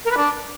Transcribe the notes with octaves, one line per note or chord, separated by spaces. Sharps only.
A#4
B4
D4